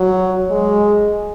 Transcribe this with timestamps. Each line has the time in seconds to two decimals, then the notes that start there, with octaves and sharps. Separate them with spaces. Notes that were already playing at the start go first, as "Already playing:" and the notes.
Already playing: F#3
0.51 G#3